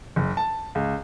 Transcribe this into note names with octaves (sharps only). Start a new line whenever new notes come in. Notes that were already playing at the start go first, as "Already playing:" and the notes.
F#1
A5
C#2